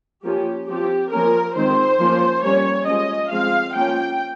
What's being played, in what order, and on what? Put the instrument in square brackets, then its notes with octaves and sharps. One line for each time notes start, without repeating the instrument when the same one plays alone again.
[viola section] F3 A#3 C#4 G4
F3 C4 G4
F3 A#3 C#4 A#4
D#3 G#3 C4 C5
F3 A#3 C#4
G3 A#3 C#4 C#5
F3 G#3 C#4 D#5
F3 G#3 C4 F5
F3 A#3 C#4 G5